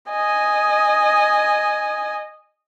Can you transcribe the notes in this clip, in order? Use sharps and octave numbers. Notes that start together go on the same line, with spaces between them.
D#5 G#5